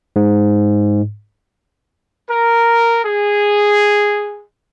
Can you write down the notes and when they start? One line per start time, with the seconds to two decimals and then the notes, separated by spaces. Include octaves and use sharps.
0.16 G#2
2.30 A#4
3.05 G#4